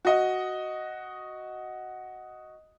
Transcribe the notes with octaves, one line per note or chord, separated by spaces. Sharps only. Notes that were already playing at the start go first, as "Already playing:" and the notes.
F#4 D#5